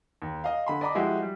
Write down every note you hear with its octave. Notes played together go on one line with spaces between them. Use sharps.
D#2
D#5 F5
D3 B5 C6
D5 D#5 A#5 B5 D6
F3 G#3 E4 F#4 G4
G3